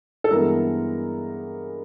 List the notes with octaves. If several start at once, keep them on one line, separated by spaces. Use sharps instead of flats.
A4
G2 E3 G#3 B3 A#4